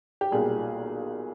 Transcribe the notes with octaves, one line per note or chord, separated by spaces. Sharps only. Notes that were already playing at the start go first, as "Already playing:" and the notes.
G4
B1 A#2 G3 G#4